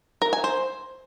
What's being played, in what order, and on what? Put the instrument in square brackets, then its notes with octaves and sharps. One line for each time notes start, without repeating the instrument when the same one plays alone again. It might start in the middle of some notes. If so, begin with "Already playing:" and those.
[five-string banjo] A#4
G#5
C5